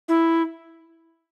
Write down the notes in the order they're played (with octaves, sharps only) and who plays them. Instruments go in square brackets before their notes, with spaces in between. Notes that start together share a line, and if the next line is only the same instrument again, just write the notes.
[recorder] E4